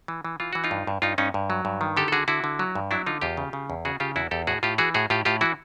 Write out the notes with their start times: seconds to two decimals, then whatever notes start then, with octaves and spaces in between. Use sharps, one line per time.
0.08 E3
0.25 E3
0.40 E3 F4
0.53 E3 F#4
0.64 D#4 F4
0.71 G2
0.87 G2
1.02 G2 D#4 F4
1.18 G2 C#4 D#4
1.34 G2
1.50 F#3
1.65 G2
1.81 D#3
1.97 D3 G4 A4
2.08 A4
2.12 D3 F#4 G#4
2.28 D3 E4 F#4
2.44 D3
2.59 F#3
2.75 G2
2.91 F#3 D4 E4
3.06 D3 D#4 F4
3.21 E2 F4 G4
3.37 C#3
3.53 C#3
3.70 E2
3.85 C#3 F#4 G#4
4.00 C#3 F4 G4
4.16 E2 E4 F#4
4.31 E2 G4 A4
4.47 A2 F#4 G#4
4.63 A2 F4 G4
4.78 E3 F#4 G#4
4.94 A2 F#4 G#4
5.10 A2 F4 G4
5.25 A2 F4 G4
5.41 E3 E4 F#4